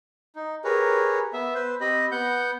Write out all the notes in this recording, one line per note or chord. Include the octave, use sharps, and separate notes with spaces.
D#4
G4 G#4 A#4 B4 C#5
B3 E5
B4 C5
C4 G4 D#5 B5
B3 F#5 G6